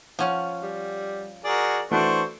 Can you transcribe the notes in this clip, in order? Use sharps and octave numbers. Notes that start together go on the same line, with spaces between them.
F3 C#4 F#5
G3
F#4 G#4 A#4 D5
E3 A3 D4 F#4 C5 C#6